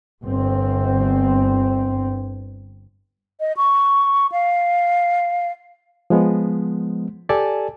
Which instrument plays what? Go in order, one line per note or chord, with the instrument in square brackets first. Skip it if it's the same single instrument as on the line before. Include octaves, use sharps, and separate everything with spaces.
[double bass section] G1 C4
[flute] D#5
C#6
F5
[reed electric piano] F3 G#3 B3
G4 A4 D5 G#5 A5